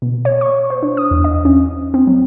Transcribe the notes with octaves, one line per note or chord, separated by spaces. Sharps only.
B2
C#5
C#6
C5
D4
D#6
E2
D#5
C#4
C4
F#3